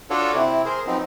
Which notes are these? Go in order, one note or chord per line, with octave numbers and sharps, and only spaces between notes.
D4 F4 F#4 A4 C#5 D5
C3 C4 E4
G#4 A#4 C5
F3 F#3 B3 C4 D#4